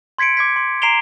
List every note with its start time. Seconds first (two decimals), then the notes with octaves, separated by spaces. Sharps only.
0.18 C6 G#6 B6 C#7 D7
0.37 D6 G#6 B6
0.56 C6
0.82 A#5 C7 D7 E7 F7 G7